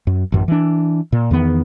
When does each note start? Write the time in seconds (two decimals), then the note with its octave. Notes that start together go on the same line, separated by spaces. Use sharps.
0.07 F#2
0.32 A1 F#2
0.48 E3 D4
1.12 A#2
1.31 E2 D#3 B3